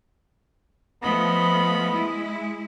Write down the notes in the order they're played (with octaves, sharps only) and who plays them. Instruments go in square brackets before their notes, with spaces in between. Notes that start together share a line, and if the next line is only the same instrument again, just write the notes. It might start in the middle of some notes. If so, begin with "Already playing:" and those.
[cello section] F3 A3 [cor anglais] B3 [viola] D#5 B5
[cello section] G#3 E4